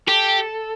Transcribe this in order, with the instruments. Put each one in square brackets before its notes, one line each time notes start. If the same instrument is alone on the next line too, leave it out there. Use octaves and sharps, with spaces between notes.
[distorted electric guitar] G4 [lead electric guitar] A4